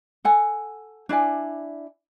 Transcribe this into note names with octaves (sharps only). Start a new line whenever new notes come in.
A4 F#5 G#5
D4 E4 D5 G#5